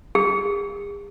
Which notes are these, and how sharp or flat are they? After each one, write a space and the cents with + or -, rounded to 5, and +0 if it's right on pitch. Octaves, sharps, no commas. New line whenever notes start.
G#4 -45